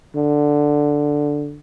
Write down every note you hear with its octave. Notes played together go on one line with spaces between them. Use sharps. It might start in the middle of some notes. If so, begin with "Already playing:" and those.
D3